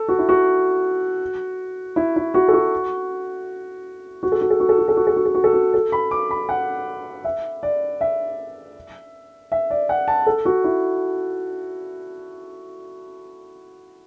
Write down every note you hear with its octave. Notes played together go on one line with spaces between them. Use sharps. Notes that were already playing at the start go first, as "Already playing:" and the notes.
Already playing: A4
F#4
E4
F#4
E4
E4
F#4
A4
F#4
F#4
A4
F#4
A4
F#4
A4
F#4
A4
F#4
A4
F#4
A4
F#4
A4
F#4
A4
B5
D6
B5
F#5
E5
D5
E5
E5
D5
F#5
A5
A4
F#4
E4